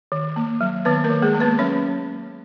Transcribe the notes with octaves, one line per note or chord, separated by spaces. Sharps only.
D#3
A#3
F#3
D#3 B3 B4
A#3 A#4
D#3
G#3 G#4
A#3
B3 B4
F#3 C#4 C#5